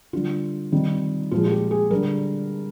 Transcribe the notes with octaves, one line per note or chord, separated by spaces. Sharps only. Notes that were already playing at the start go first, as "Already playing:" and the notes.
D3 G3 F4
C3 D#3 G3
A#2 F3 G#3 F4
F4
G4
G#4
D3 G3 A#4